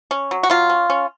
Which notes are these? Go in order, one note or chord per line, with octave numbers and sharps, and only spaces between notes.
C#4
F#3
F#4
F#3 F4
C#4
C#4